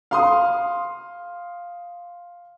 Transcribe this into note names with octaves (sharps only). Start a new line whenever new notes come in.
F5 C6 D#6